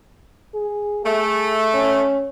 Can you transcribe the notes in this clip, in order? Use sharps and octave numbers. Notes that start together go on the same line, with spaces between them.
G#4
A3 G#4
C#4